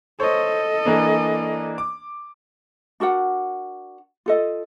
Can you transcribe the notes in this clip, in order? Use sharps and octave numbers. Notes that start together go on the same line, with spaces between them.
A4 C5 C#5 D#5
E3 A#3 D4
D6
D4 F#4 A#4 F#5
F4 A4 D#5